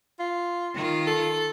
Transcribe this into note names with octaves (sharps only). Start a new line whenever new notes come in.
F4
D#3 F4
A4